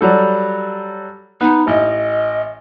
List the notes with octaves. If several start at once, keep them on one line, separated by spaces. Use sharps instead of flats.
F#3 G3 A4
B3 D#4
A1 D#5